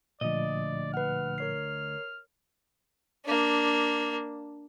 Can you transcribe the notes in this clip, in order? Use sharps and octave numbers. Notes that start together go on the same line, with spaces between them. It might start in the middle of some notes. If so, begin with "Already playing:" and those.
D2 A#2 F3 D5 D#5
B4 F#5 F6
A#4 C#5 C7
A#3 D4